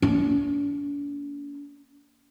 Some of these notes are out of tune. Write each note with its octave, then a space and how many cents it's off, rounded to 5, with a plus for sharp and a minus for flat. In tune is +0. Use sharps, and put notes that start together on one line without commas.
A#3 +0 D4 -45